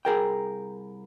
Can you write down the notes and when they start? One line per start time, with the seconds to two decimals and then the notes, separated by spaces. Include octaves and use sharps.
0.05 C2 G#4 A#4 G5